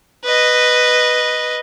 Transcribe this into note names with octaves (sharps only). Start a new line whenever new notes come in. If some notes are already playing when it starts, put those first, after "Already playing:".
B4 D#5